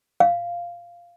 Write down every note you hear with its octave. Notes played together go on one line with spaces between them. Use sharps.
F5